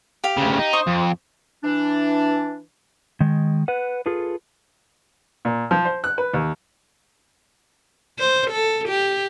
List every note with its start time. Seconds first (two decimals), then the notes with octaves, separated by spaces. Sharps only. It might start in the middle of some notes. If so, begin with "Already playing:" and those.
0.24 G4 F5
0.38 D2 C#3
0.59 D#4
0.73 C5 C#6 D#6
0.87 F2
1.64 E3 D4
3.20 D#3 G#3
3.68 B4 F#5
4.06 F4 G#4 A4 B4
5.45 A#2
5.71 F3
5.85 C5
6.04 F#6
6.18 B4
6.33 D#2
8.19 C5
8.50 A4
8.89 G4